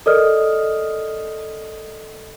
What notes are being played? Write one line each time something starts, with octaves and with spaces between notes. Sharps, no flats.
A4 A#4 D5 D#5 D#6 F6